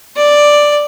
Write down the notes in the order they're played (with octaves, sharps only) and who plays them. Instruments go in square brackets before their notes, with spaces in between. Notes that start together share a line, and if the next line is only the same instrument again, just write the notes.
[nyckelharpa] D5